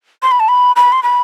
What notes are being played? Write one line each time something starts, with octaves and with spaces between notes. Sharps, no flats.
C6
B5
A5
B5
B5
C6
B5